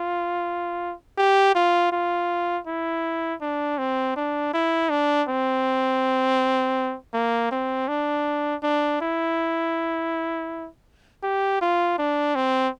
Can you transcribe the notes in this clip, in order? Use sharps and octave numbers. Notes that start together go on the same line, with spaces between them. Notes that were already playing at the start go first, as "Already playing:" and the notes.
Already playing: F4
G4
F4
F4
E4
D4
C4
D4
E4
D4
C4
A#3
C4
D4
D4
E4
G4
F4
D4
C4